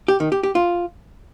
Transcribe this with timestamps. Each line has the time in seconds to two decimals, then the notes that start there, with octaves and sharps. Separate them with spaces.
0.08 G4
0.20 D#3
0.32 G4
0.43 G4
0.55 F4